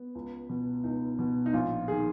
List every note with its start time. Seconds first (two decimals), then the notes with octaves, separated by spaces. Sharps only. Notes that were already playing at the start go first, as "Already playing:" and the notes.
Already playing: B3
0.15 C#2
0.49 B2
0.83 C#2 D#4
1.19 B2
1.46 D#4
1.53 A#1 F4
1.88 D#3 G#4